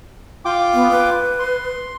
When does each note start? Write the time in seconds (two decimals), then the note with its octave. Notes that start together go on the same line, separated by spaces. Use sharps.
0.45 F4 G5 D6
0.74 B3
0.91 B4
1.39 C6